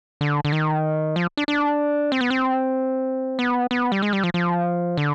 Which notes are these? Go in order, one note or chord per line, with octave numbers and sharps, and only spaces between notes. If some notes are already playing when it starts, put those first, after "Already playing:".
D3
D3
D#3
F3
D4
D4
C4
B3
C4
B3
B3
G3
G#3
G3
F3
F3
D3